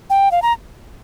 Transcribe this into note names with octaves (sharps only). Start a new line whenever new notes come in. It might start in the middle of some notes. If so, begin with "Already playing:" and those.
G5
F5
A#5